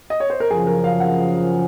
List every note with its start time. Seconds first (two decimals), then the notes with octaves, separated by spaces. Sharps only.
0.10 D#5
0.20 C#5
0.30 C5
0.40 A#4
0.50 F#2 C#3 F3 G#4
0.67 A#4
0.84 F5
1.00 F#5